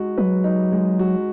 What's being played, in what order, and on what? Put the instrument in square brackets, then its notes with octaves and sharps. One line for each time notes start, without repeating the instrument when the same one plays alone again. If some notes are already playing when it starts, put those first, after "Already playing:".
Already playing: [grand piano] G#3 D#4 F#4
[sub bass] F#3 [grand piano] B4
[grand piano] D#4
G#3
F#4